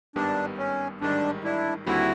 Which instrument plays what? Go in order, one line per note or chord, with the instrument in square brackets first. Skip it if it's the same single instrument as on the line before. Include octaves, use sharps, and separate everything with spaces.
[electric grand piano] G#1 G2 D#3 G3 B3 [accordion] D4
[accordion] C#4
[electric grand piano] A1 G#2 D#3 G3 [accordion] D4
[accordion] D4 E4
[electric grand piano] D#2 D3 G3 C4 [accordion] E4 F#4